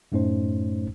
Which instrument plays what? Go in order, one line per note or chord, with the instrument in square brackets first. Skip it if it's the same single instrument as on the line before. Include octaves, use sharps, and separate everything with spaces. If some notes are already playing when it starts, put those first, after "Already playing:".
[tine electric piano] F#2 A2 A3 C#4 D#4 C5